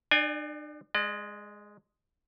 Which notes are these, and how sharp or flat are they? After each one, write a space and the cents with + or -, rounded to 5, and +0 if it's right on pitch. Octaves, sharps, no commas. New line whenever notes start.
D4 +45 D5 +0 G#5 -25
G#3 +0 D5 +45